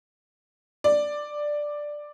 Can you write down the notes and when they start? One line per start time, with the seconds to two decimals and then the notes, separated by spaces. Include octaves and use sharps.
0.84 D5